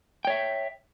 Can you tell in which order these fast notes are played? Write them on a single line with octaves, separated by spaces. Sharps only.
G5 C#5 E5